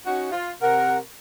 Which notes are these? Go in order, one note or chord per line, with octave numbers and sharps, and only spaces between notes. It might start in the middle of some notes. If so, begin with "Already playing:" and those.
C#4 D#4 F#4
F4
C3 A#4 F#5